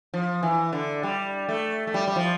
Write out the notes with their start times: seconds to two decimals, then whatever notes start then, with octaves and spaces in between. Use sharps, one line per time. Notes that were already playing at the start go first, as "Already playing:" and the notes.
0.14 F3
0.43 E3
0.73 D3
1.03 G3
1.49 A3
1.87 A3
1.94 G3
2.08 G3
2.16 F3